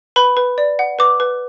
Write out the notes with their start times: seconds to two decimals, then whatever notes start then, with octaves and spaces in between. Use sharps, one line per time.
0.16 B4 B5
0.37 B4
0.58 D5
0.79 F#5
0.99 B4 D6
1.20 B4